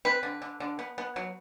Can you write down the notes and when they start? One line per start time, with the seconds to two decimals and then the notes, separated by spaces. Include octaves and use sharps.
0.05 C4 B4
0.23 D3
0.42 D3
0.60 D3
0.79 B3
0.98 B3
1.16 F#3